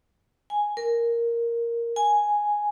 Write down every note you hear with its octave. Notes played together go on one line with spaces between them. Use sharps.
G#5
A#4
G#5